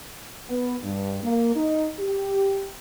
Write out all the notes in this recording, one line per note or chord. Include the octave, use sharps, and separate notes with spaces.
B3
G2
A#3
D#4
G4